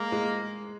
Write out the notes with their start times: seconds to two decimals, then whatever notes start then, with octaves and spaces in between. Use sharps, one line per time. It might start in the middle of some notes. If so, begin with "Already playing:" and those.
Already playing: G#3 A#3
0.12 G#3